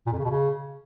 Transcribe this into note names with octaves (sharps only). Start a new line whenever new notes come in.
A#2
F2
C#3
B2
C#3